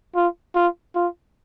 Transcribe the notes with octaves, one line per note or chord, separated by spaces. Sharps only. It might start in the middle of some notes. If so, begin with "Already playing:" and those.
F4
F4
F4